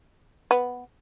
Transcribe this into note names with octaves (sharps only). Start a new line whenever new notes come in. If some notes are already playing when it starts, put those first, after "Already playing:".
B3